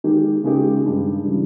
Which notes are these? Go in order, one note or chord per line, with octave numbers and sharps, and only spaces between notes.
D#3 G#3 D#4 G4
C#3 G#3 D#4 G4
G2 D#3 G#3
C#3 E3 G3